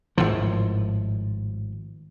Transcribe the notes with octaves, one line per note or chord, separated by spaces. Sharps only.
G#1 A2 F3